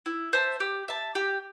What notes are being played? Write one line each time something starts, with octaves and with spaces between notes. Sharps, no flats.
E4
C5 E5 A5
G4
E5 A5
G4